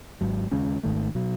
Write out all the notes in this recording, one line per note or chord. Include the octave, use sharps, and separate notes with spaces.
G#1 G#2 F#3
D#2 C#3 G#3 C#4
G#1 G#2 D#3 A3
B2 F#3